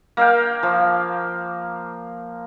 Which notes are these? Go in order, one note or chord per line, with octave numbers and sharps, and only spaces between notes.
A#3 F5 G5
F3